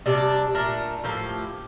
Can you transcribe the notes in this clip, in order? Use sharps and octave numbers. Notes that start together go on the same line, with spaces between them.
C3 G3 D4 D5
A#2 A3 D4 A#4
A2 F3 A#3 G4